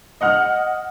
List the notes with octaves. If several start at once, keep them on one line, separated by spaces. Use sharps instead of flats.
D#5 F#5 F6